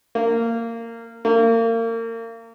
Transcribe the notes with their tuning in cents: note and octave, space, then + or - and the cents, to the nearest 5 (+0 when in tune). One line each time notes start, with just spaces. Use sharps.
A#3 -20
A#3 -35